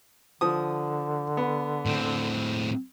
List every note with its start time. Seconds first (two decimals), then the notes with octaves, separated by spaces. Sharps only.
0.41 D3 F3 D#6
1.37 B3
1.86 A2 C4